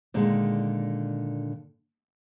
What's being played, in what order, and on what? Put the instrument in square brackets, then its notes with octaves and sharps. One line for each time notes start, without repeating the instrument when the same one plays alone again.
[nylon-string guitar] A#2 D3 D#3 G#3